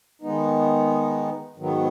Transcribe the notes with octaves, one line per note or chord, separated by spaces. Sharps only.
D#3 G#3 B3 D#4
G#2 D#3 F#3 B3